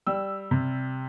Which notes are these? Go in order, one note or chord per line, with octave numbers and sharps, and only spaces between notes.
G3 E6
C3